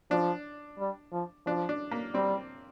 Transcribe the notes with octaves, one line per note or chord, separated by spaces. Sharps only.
F3 D4
G3
F3
F3 D4
D4
A#3
G3 C4